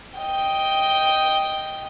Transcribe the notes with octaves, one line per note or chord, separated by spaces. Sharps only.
D#5 G5